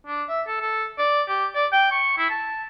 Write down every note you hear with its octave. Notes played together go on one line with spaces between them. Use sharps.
D4
E5
A4
A4
D5
G4
D5
G5
C#6
E4
A5